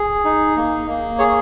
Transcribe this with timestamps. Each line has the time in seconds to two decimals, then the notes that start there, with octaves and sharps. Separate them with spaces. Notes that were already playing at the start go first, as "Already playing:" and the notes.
Already playing: G#4
0.25 D#4
0.57 A#3
0.87 A#3
1.19 G#4 C#5